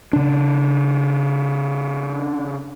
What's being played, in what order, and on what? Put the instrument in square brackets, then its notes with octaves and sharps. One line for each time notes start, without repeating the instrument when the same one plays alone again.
[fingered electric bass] C#3 D4